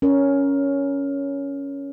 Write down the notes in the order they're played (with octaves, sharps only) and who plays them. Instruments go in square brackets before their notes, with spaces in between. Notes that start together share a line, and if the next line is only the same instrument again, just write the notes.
[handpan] C#4 A#4